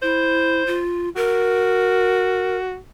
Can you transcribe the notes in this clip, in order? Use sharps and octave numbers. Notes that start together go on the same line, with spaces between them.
E4 C5
F4
F#4 A#4